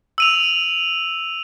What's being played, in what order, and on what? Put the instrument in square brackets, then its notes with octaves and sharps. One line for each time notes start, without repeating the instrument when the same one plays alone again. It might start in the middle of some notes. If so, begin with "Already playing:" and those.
[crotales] E6 D#7 F7